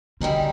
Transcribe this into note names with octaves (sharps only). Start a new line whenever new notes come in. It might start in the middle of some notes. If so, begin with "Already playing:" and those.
F#2 D3 D#3 G3